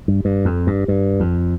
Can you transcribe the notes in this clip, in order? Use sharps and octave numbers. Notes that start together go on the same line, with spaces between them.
G2
G2
F2
G2
G2
F2